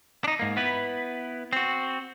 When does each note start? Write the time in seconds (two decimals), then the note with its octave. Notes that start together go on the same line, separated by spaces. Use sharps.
0.24 D4 D#4
0.39 G#2 A#3
0.57 B3 E4 B4
1.53 C4 F#4